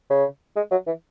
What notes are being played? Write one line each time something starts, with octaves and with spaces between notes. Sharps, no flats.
C#3
G#3
F#3
E3